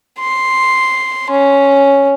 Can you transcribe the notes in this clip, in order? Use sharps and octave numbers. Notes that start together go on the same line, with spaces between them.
C6
C#4